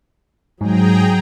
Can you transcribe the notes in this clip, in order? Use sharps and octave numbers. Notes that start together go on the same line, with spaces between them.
G#2 F#3 G#4 G5 A#5